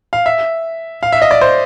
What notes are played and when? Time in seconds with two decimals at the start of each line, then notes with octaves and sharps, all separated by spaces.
0.13 F5
0.26 E5
1.03 F5
1.12 E5
1.22 D#5
1.31 D5
1.41 C5